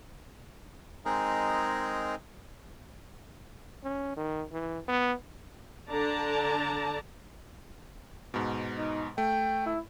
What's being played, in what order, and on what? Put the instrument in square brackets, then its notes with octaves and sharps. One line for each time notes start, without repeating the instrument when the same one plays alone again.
[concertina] G#3 C4 D#4 G#4 A#4
[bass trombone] C#4
D#3
E3
B3
[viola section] D3 D4 D5 A5 A#5
[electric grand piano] G#2 B2
[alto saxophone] D#4
[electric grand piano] A3 [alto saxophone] G5
[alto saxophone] E4